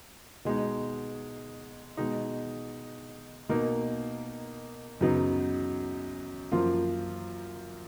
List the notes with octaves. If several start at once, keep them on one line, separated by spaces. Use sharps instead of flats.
B2 G#3 D#4
B2 G#3 D#4
B2 A#3 D#4
F#2 C#3 F#3 B3 D#4
F#2 F3 A#3 F4